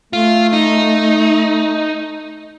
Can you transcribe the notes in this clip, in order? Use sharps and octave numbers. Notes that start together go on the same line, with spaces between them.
A3 F4
D#4